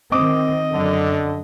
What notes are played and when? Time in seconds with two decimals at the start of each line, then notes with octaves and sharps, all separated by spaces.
0.12 D#3 C4 D#5 D6 D#6
0.71 F#2 D3